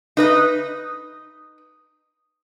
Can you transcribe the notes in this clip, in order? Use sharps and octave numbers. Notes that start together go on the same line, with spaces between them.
D#4 B4 D#5